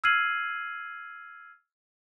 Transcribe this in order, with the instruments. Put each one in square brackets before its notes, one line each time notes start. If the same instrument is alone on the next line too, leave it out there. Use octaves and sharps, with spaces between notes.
[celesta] E6 F6 G#6 C7 D#7 F#7